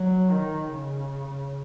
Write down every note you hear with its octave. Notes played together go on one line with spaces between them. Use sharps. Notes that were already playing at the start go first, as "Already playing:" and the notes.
Already playing: F#3
D#3
C#3